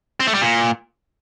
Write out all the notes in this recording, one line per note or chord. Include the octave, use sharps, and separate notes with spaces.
C4
A3
G3
A#2